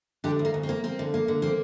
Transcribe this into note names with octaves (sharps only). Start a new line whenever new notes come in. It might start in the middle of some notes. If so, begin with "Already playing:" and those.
D3 D4 G4
D2
A#3
D2
C4
A#3
A#3 C4
D3
A#3
D3
A#3 C4